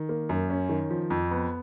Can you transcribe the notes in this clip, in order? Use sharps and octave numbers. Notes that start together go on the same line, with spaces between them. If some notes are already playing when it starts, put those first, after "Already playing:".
Already playing: D#3
A#3
F#2
C#4
D#3
F3
F2
B3